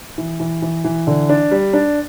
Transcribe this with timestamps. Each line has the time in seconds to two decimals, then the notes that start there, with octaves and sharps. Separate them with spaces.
0.18 E3
0.40 E3
0.62 E3
0.84 E3
1.07 D3
1.29 D4
1.51 G3
1.73 D4